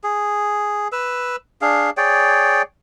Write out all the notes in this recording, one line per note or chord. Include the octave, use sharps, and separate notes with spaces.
G#4
B4 E6
D4 G#4 F5
G#4 C#5 D5 G5